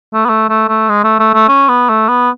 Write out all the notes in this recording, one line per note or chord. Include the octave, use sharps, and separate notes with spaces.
A3
B3
A3
A3
A3
G#3
A3
A3
A3
C#4
B3
A3
B3